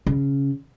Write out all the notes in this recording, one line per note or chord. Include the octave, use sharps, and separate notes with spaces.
C#3